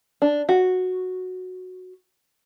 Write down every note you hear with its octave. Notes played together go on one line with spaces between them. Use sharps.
D4
F#4